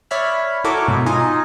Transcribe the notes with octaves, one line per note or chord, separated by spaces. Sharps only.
C#5 D5 E5 B5 F6
E4 F#4 A4 A#4 C#5 D6
G#2 B2
D#4 F4 D#5 G#5 A#5